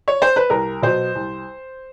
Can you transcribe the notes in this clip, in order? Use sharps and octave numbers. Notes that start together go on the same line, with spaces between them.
C#5
C5
B4
C2 A#4
B2 F#3 C5
C2